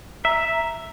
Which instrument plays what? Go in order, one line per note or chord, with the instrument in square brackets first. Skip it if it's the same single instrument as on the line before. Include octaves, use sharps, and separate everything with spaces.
[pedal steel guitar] E5 [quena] A#5